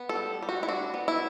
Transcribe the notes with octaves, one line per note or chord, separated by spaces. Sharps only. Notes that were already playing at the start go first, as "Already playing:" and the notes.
Already playing: B3
A4
G3
G3
F#4
E4
D4 F#4
B3
E4